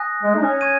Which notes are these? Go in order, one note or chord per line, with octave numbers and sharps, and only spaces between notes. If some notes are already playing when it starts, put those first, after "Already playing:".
Already playing: G#5 D#6 F#6 A#6
G#3
D#4
C#4
C#6 G#6 D#7